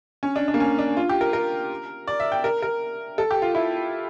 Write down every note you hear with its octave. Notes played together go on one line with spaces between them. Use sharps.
C#4
D4
D4
A#3
C#4
D4
F4
G4
A#4
A#4
D5
E5
G5
A#4
A#4
A4
G4
F4
E4